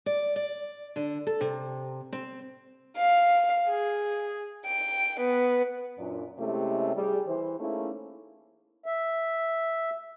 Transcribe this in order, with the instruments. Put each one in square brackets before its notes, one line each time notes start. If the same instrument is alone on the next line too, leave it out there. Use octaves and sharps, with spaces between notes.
[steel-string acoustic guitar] D5
D5
D3
A4
C3
C4
[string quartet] F5
G#4
G5
B3
[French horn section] F#2 A#2 D4
C3 G#3 A3 C#4 E4 G4
G3 G#4
E3 C5
A3 A#3 C#4 D#4 E4 G#4
[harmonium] E5